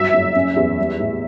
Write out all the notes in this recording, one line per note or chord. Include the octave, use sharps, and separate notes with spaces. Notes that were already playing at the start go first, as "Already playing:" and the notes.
Already playing: G1 F#3 E5
F#1
C#4
E2
G3
A1